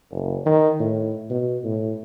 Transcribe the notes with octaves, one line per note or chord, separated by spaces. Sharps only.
F#1
D#3
A2
B2
A2